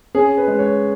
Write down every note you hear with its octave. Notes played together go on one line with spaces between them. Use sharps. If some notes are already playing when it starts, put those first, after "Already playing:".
C#4 G#4
B4
G#3
C#5